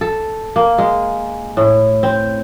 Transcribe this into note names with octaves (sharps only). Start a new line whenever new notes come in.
A4
A#3
G#3
A2
C4